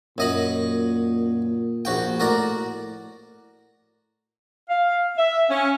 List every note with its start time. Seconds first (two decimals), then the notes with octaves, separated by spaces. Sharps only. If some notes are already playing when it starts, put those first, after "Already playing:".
0.18 F#2 A#2 D#5 B5
1.85 A#1 F#4 G5
2.20 A2 F#4 A#4 D5
4.70 F5
5.18 E5
5.50 C#4